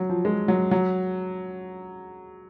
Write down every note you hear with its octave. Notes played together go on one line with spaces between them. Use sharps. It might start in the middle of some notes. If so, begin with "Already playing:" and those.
Already playing: F#3
F3
G#3
F#3
F#3